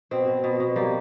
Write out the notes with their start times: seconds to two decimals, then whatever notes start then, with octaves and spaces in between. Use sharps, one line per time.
0.11 B2 C4
0.27 B2
0.44 B2
0.60 B2
0.76 G3 A#3